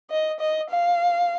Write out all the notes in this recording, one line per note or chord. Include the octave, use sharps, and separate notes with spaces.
D#5
D#5
F5